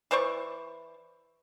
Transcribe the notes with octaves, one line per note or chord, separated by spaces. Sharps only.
E3 C5 D5 C#6